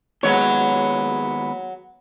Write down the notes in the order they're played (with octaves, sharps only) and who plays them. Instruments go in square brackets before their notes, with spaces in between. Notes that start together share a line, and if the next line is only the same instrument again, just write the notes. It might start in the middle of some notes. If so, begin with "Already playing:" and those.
[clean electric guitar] D#2 G#3 B3 [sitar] F#3 C#5